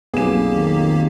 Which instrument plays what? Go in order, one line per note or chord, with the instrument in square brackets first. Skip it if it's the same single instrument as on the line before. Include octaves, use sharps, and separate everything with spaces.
[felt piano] B1 F2 E7 [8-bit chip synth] A#3 G4 [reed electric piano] B3 G#4
[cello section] D#3